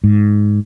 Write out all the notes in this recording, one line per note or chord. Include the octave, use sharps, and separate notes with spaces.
G#2